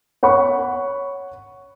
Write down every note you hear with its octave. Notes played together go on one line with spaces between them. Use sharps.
C#5 F#5 B5 C#6